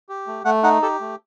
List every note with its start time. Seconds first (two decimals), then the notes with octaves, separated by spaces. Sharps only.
0.09 G4
0.27 A3
0.45 A3 F#5
0.63 D#4 F#5
0.82 G4 A4
1.00 A3